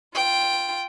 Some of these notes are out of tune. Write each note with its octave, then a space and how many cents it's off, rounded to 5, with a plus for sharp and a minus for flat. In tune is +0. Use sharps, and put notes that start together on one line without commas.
F4 +0 G5 +0